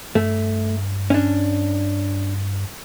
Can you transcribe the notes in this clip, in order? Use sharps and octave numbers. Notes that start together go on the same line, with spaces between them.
G2 A3
C#4 D4